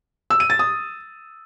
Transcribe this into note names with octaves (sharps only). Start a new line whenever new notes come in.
E6
D#7
A6
D#6